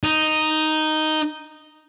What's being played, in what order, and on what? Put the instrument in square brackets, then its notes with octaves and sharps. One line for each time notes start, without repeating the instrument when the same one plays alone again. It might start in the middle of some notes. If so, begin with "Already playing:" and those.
[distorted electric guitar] D#4